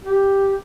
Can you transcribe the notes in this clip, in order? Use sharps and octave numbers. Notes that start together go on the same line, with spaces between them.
G4